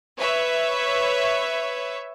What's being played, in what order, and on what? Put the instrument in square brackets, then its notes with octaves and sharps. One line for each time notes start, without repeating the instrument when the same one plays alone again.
[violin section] B4 C#5 E5